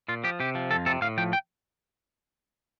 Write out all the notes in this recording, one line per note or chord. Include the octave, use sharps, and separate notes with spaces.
A#2 F4
F3 G4
C3 G4
F3
F2 A4
C3 A4
A2 F5
F3 G5
G5